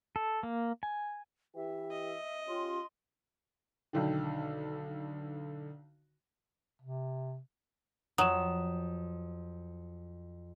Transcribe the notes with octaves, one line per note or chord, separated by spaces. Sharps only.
A4
A#3
G#5
E3 G4 E5
D#5
C#4 F4 G4 C6
B1 D3 D#3
C3
F2 F#3 D#6 E7